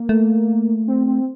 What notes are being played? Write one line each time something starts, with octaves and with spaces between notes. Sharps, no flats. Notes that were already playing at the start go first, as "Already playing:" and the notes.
Already playing: A#3
A3
C4
C4